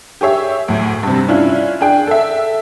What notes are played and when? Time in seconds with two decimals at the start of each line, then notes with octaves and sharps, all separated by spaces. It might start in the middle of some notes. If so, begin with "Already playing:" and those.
0.21 G4 G#4 C#5 E5
0.68 D2 A2
1.03 G2 C3
1.28 C#4 D4 E4 F4
1.81 D4 G#4 G5
2.07 A4 E5